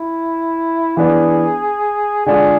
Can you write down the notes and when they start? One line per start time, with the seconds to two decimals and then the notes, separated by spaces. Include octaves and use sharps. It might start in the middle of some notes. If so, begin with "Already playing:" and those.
Already playing: E4
0.97 E3 B3 D4 G#4
2.26 D3 G#3 D4 F4 G#4